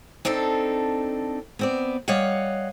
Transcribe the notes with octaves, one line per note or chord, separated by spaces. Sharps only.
C4 D4 D#4 A4
B3 C4 D5
G3 C#5 D#5 F5 F#5